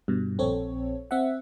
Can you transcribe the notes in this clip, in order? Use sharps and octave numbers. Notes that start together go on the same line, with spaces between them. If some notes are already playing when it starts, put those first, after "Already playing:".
G2 B2
A#1 C4 A4 C#5
C4 E5 F#5